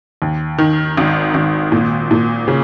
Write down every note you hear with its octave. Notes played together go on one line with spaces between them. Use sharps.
D#2
D#3
G#1
G#1
A#2
A#2
C#3